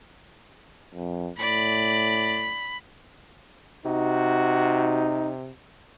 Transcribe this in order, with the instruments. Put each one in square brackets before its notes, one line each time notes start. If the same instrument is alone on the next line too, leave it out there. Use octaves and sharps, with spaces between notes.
[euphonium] F2
[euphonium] A2 [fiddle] D5 [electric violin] B5
[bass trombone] C3 [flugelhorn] D#4 [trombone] F#4